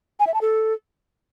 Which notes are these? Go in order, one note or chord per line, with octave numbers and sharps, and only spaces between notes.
G#5
E5
A5
A4